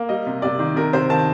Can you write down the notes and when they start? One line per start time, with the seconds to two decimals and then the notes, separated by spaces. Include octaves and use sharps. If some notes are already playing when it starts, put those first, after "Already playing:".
Already playing: A#3
0.09 G3 D#5
0.27 C3
0.42 C3 D5
0.59 D#3
0.76 C3 A#4
0.93 C3 C5
1.10 D#3 A5